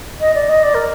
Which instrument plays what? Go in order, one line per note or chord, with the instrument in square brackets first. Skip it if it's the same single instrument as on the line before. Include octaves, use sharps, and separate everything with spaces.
[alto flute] D#5
D5
D#5
D5
A#4